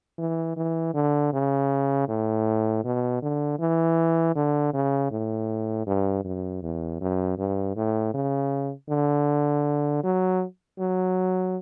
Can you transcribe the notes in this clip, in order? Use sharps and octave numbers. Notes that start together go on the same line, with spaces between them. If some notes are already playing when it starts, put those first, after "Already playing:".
E3
E3
D3
C#3
A2
B2
D3
E3
D3
C#3
A2
G2
F#2
E2
F#2
G2
A2
C#3
D3
F#3
F#3